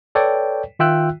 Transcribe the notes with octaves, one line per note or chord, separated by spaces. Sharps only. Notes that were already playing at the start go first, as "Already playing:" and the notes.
A4 B4 C#5 D5 G5
D#3 F4 E5 G5 E6 F#6